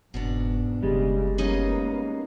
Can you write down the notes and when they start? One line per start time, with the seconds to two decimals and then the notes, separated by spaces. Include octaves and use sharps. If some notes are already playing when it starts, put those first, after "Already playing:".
0.14 F#1 G#2 B2 B3 D4
0.83 F#1 C#3 G3 G#3
1.38 A#3 B3 C#4 D#4 D#5